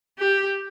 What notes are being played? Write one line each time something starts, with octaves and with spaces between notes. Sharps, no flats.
G4